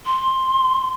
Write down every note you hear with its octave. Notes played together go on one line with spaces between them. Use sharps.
C6